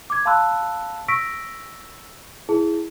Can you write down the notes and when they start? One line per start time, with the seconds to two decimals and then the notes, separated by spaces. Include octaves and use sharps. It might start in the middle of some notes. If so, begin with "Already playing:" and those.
0.10 D6 G#6
0.25 F5 A5 B5 C6 E6 F#6
1.08 C#6 E6 A#6 B6 D7
2.49 E4 G#4